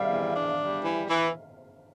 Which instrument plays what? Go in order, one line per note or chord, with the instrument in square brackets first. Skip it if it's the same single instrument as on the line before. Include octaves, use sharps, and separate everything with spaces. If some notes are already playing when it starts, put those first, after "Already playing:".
Already playing: [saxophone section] G3 [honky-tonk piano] E5 F5
[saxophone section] E2
D4
G3
E3
E3